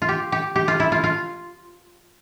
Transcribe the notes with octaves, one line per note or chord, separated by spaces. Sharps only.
F4
G4
G4
G4
F4
E4
F4
F4